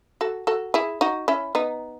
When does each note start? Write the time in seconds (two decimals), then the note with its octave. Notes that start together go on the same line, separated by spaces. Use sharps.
0.21 F#4 A4
0.47 F#4 A4
0.74 E4 G#4
1.01 D#4 F#4
1.28 C#4 E4
1.55 B3 D#4